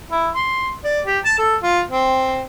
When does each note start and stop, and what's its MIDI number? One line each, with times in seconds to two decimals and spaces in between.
0.10 0.28 64
0.35 0.69 84
0.84 1.01 74
1.06 1.19 67
1.24 1.33 81
1.38 1.56 69
1.63 1.81 65
1.91 2.43 60